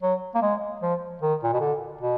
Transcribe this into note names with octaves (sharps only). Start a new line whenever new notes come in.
F#3
A#3
G#3
F3
D#3
A#2
B2
D3
B2